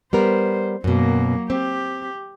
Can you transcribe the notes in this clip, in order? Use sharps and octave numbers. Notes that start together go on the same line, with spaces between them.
G3 B3 A#4 C5
F#2 B2 F#3 A#3
C4 G4